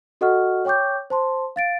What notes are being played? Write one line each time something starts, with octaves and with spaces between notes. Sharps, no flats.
F#4 A4 D#5 F#5 C#6 F6
C#5 G5 C#6 D6 G6
C5 A5 C6
F5 A6 D7